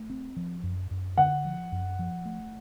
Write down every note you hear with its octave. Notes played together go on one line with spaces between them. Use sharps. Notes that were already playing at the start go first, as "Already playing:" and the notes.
Already playing: A3
C4
F3
F#2
F#2
D3 F#5
F3
F#2
F3
A3